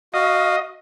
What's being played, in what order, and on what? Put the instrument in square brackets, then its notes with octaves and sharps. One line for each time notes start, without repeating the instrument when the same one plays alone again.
[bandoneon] F#4 F5 [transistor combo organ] D#5